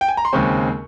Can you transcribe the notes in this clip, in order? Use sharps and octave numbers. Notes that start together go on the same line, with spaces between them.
G5
G#5
A#5
C6
D#2 C#3 G#3 C4 C#6